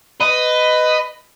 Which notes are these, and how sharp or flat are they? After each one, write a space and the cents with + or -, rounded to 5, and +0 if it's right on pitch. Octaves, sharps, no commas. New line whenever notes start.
B4 +15 D#5 +0